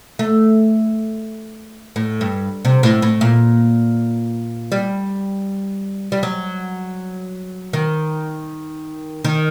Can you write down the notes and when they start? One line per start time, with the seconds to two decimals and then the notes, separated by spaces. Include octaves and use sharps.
0.19 A3
1.96 A2
2.21 G2
2.65 C3
2.83 A2
3.02 A2
3.21 A#2
4.72 G3
6.12 G3
6.23 F#3
7.73 D#3
9.24 D#3